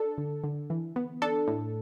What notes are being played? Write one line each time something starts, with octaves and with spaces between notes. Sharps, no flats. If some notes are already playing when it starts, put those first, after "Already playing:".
Already playing: D4 A4
D3
D3
E3
B3
D4 A4
A2